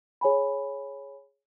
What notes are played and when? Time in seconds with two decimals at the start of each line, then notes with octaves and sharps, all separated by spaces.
0.21 G#4 C#5 G#5 B5